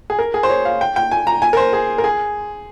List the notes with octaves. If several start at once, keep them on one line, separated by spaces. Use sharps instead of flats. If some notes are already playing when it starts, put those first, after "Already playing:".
G#4
A#4
G#4
C5
C#5
F5
G5
G5
G#5
A#5
G#5
A#4
C5
G#4
A#4
G#4